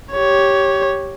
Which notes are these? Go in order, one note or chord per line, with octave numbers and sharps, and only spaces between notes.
G4 C#5